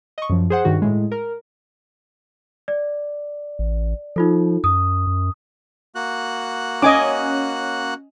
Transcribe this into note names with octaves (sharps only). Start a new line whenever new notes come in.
D#5 C#6
F#2 F3
G#4 C5 F#5
G2 D#3 F#4
A2 G#3
A#4
D5
A1
F3 D#4 F4 A4
F#2 D#6
F#2
A#3 F#4 F#6
C#4 D#5 G#5 D6